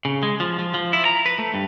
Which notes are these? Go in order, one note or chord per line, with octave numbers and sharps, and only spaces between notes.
C#3
G#3
F3
F3
F3
E4
A#5
B4
A3
G2